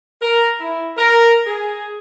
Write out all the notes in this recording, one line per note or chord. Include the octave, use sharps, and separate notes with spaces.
A#4
E4
A#4
G#4